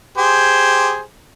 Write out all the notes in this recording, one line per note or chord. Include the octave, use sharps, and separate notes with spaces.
G4 G#4 C5